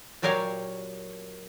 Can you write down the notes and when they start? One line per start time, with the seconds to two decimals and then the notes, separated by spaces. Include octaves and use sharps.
0.22 A#2 F#3 G4 A#4 C#5 F5